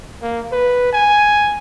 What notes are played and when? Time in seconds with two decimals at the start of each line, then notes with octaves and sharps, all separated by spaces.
0.22 A#3
0.52 B4
0.93 G#5